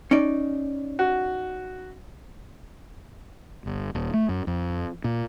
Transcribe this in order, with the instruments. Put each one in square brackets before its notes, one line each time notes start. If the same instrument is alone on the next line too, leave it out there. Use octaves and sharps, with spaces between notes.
[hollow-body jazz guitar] C#4 D#4 D5
[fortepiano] F#4
[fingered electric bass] G1
D#1
A3
F#2
F2
A#2